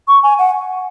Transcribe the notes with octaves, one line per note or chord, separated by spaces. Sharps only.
C#6
G#5
F#5